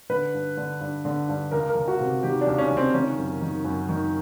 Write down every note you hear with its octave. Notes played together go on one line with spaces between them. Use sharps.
D3 B4
G2
D3
G2
D3
G2
C#2 A#4
A#4
C#2
F#4
C3
D#3 G4
D4
C#2
C#4
C#2
C4
D#3 C#4
F#2
D#3
F#2
D#3